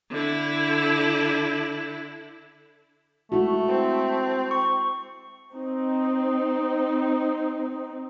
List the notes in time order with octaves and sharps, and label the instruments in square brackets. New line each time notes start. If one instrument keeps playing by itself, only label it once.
[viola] D3 E4
[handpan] G#3 E4 F#4 [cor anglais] A3
[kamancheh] C4
[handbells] C#6
[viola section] C4 D#4